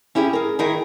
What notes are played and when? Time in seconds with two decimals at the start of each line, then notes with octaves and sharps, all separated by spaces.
0.15 C#4 E4 G4 G#4
0.33 G#4 A#4
0.59 D#3 D#4 E4 G#4 A#4